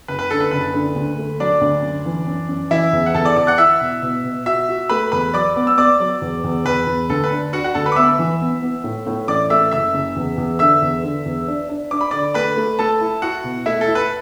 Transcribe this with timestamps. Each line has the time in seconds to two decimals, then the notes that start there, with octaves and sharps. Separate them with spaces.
0.08 F#1 B4
0.19 B4
0.30 D3 A4
0.40 B4
0.51 F#1 B4
0.74 D3
0.95 D2
1.18 A3
1.40 F#3 D4 D5
1.61 D2
1.83 F#2
2.06 E3
2.27 F#2
2.49 F#2
2.70 E3 E4 E5
2.93 E2
3.06 F#5
3.14 E2 A4 A5
3.25 D5 D6
3.36 E2 D5 D6
3.47 F#5 F#6
3.58 E4 E5 E6
3.81 B2
4.02 B2
4.24 B2
4.46 F#4 E5 E6
4.69 F#4
4.89 A3 B4 B5
5.12 E2 B4 B5
5.33 F#3 D5 D6
5.56 B3
5.67 E6
5.77 B3 D5 D6
6.00 F#3
6.22 E2
6.44 E2
6.65 E2 B4
6.87 E2
7.09 D2 A4
7.24 B4
7.32 D4
7.53 D4 F#4 F#5
7.64 F#4 F#5
7.75 D2 A4 A5
7.86 B4 B5
7.92 D6
7.96 B3 E5 E6
8.19 E3
8.41 B3
8.62 B3
8.84 A2
9.07 A2
9.28 A1 D5 D6
9.50 A3 E5 E6
9.71 F#1 E5 E6
9.94 F#1
10.16 E2
10.37 E2
10.59 D3 E5 E6
10.82 E2
11.03 D3
11.25 E2
11.48 D4
11.69 D4
11.91 D4 D6
12.01 B5
12.11 D3 D5 D6
12.34 A3 B4 B5
12.57 A3
12.79 A3 A4 A5
13.01 E4
13.22 E4 F#4 F#5
13.44 B2
13.66 A3 E4 E5
13.81 A4
13.88 E4
13.95 B4